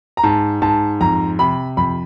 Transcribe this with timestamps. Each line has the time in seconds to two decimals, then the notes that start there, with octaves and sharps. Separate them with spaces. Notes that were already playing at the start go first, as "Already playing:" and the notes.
0.17 A#5
0.23 G#2 A5
0.62 G#2 A5
1.01 F2 A#5
1.39 C3 B5
1.77 F2 B5